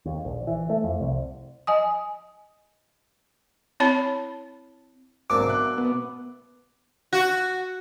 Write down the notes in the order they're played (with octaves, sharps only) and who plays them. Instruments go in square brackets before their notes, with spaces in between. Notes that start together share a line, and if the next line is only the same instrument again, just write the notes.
[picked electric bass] D#2
A#1
E3
A3
F2
C2
[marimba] D#5 G#5 D#6
[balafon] C4 E4 C#5 A5 B5
[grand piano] G#1 C4 [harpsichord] F#3 A#3 D4 [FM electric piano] D6
[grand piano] B2 E5 F#6
[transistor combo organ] B3
[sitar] F#4